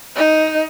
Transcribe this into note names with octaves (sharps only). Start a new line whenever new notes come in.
D#4